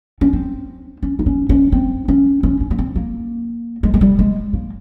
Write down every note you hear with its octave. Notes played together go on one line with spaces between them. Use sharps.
C#4
C4
C#4
D#4
C#4
C#4
C4
C#4
C#4
C#4
A#3
C4
A#3
G#3
G#3
G3
G#3
A#3